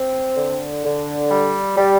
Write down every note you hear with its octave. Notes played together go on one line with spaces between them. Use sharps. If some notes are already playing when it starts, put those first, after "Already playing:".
Already playing: C4
D3
D3
G3
G3